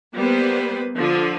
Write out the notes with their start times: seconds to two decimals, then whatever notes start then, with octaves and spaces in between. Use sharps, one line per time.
0.15 G3 A#3 B3 B4 C5
0.96 D3 F3 F4